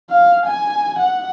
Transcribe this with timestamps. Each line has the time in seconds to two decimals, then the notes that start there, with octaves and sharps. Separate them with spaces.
0.10 F5
0.46 G#5
0.99 F#5